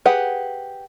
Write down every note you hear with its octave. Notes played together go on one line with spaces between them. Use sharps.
G4 G#4 B4 F#5